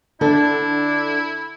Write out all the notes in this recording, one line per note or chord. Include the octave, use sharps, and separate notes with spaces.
D3 D4 E4 A4